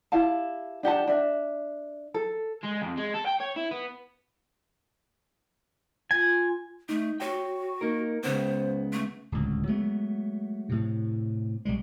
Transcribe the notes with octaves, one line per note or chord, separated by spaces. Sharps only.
E4 G4 F5 A5
D4 G4 F#5 A5
D4 E5
A4
G#3
F2
G#3
A4
G5
C#5
E4
B3
F4 G#5
A3 D#4
F#4 C#5 G5
A#3 D#4 A#4
C#2 C#3 B3 C5
A3
D1 C#2
F#3 G#3 A3 B3
A2 C3
B1 G3 G#3